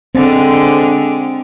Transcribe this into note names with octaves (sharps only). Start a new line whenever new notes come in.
D3 G#3 C4